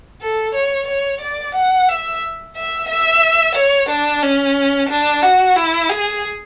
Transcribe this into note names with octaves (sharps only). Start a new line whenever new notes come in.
A4
C#5
C#5
D5
F#5
E5
E5
E5
C#5
D4
C#4
D4
F#4
E4
G#4